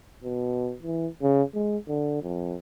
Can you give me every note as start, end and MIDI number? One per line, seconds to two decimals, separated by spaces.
0.24 0.75 47
0.83 1.08 52
1.22 1.43 49
1.54 1.77 56
1.88 2.18 50
2.22 2.57 41